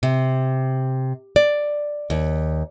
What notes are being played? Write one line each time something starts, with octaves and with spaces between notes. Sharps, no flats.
C3
D5
D#2